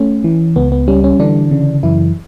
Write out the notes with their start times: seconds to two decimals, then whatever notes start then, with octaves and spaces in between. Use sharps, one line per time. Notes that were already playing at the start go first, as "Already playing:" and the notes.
Already playing: A3 C#4
0.24 E3
0.56 C#2 B3
0.72 B3
0.88 G3 C#4
1.04 C#4
1.20 D3 E3 D4
1.51 C#3
1.83 F#2 E3 E4